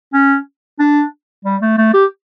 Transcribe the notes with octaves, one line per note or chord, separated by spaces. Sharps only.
C#4
D4
G3
A3
A3
G4